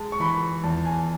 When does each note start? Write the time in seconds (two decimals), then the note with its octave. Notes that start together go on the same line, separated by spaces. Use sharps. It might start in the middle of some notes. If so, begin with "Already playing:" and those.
Already playing: G#3 A5
0.12 C#6
0.20 E3 B5
0.64 E2 A5
0.86 G#5